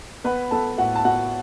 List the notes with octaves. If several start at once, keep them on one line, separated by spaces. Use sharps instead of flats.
B3 B4 B5
B3 A4 A5
A2 F#4 F#5
A5
B3 F#4 F#5